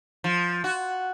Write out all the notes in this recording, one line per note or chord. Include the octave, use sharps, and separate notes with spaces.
F3
F#4